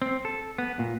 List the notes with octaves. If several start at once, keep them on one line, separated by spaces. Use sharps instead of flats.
C4
A4
B3
A#2